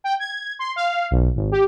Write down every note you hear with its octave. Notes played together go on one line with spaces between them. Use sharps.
G5
G#6
C6
F5
B1
G#1
G4